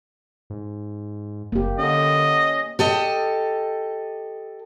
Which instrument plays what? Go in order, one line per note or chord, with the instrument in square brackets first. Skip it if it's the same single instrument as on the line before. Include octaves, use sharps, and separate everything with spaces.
[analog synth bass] G#2
[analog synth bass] F#1 [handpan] A#3 G4
[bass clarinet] D3 [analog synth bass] C#4 [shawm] D#5
[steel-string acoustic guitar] G4 A4 D#5